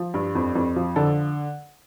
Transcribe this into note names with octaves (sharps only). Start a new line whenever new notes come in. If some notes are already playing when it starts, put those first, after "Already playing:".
Already playing: F3
G2
F2
F2
F3
D3 A4